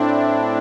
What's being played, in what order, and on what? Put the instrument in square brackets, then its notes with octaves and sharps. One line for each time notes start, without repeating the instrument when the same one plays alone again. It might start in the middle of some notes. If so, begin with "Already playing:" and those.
Already playing: [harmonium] A2 A3 C4 E4 [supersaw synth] D4